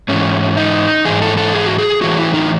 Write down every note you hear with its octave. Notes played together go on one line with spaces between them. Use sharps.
G#2 E3 C#4
D#4
G#2 E3 G#4
A4
A4
G#4
F#4
G#4
A2 E3 F#4
E4
D#4